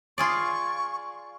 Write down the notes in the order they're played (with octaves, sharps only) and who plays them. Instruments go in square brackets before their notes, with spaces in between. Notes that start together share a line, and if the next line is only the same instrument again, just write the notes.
[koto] F4 G#4 D5 [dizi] C#6